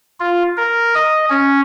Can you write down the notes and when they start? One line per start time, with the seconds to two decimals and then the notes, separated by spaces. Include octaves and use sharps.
0.20 F4
0.57 A#4
0.95 D#5
1.30 C#4